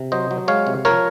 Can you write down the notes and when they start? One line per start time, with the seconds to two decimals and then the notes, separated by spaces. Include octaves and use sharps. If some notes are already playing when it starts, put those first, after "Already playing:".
Already playing: C3
0.12 F#3 C5 D#5
0.31 F#3
0.48 G#3 C#5 F5
0.67 C3
0.85 F3 A#4 C#5